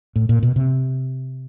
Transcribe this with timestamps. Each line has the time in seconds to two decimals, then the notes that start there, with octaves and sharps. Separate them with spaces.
0.16 A2
0.29 A#2
0.43 B2
0.56 C3